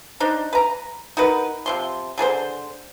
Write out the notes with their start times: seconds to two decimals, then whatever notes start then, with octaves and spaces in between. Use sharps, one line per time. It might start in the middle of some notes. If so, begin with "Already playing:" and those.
0.20 D4 D#4 C5
0.53 B4 A#5
1.17 D#4 F#4 A#4 B4
1.66 C3 F3 C6
2.18 D3 G#4 B4 C5